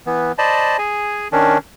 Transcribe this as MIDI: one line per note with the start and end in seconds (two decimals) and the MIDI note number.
0.06 0.32 52
0.06 0.32 59
0.38 0.77 72
0.38 0.77 74
0.38 0.77 75
0.38 0.77 81
0.38 0.77 83
0.78 1.28 68
0.78 1.28 80
1.32 1.58 51
1.32 1.58 61
1.32 1.58 62